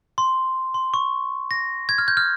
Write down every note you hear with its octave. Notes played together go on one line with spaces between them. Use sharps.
C6
C6
C#6
A#6
G#6
F6
G6
F6